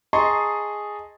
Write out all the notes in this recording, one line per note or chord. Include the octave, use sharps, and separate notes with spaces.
G#4 D#5 A5 A#5 C6 C#6